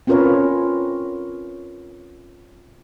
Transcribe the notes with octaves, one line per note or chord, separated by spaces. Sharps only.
C4 C#4 F4 A#4 B4 C#5